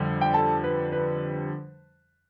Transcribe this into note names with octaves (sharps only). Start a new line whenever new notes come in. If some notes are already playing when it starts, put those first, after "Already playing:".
Already playing: F2 D3 G3
G5
A4 A5
B4
B4